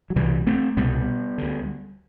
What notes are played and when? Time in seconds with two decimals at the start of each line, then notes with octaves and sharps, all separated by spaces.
0.10 F#3
0.16 C2 B2 E3 G3
0.47 A3 C4
0.77 C2 B2 G3 B3
1.38 D2 D3